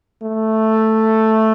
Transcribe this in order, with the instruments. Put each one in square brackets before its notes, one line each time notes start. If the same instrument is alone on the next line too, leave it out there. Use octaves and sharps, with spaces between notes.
[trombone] A3